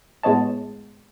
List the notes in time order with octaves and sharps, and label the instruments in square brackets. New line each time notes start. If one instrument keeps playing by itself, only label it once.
[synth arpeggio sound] A2 G#3 B3 C#5 D#5 A5